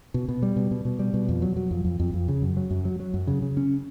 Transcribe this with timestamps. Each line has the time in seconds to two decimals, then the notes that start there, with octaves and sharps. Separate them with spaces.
0.14 B2
0.29 B2
0.43 G3
0.56 B2
0.71 B2
0.85 B2
0.99 G3
1.14 B2
1.29 F2
1.42 F#3
1.56 F#3
1.71 F2
1.85 F2
2.00 F2
2.14 F2
2.28 C#3
2.42 F#2
2.57 F#3
2.71 F#2
2.85 F#3
3.00 F#3
3.14 F#2
3.27 C#3
3.42 C#3
3.57 C#4